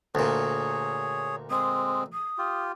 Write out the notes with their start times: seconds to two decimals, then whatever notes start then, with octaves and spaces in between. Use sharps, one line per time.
0.15 D2 A#2 G#4 C#5
1.50 G#3 C4 D#6
2.13 D#6
2.38 F4 G4